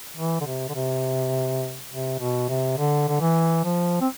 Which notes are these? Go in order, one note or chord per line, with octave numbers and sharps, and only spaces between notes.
E3
D3
C3
D3
C3
C3
B2
C3
D3
D3
E3
F3
C4